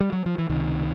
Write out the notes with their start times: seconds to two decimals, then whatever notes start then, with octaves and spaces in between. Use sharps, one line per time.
0.01 G3
0.13 F#3
0.26 F3
0.38 E3
0.49 C#2 C3 D#3